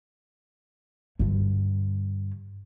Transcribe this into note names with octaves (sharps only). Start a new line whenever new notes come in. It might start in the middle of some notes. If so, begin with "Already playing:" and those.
G2 D3